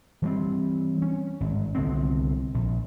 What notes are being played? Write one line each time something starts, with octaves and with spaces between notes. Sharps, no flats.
E3 G3 C4
C#4
G#1
C2 D3 B3 C4
A#1